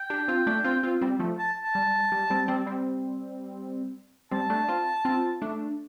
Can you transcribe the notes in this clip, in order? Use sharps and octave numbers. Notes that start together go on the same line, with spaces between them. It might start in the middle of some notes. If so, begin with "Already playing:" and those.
Already playing: G5
D4 G4
C4 F4
A3 D4
C4 F4
C4 F4
G3 C4
F3 A3
A5
A5
G3
G3
G3 C4
G3 C4
G3 C4
G3 C4 A5
A3 D4
C4 F4
C4 F4
A3 D4